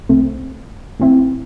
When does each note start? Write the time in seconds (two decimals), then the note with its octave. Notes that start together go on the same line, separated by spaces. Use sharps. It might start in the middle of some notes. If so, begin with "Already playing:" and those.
0.09 C2 C3 A3 C4
1.00 A2 E3 C4 E4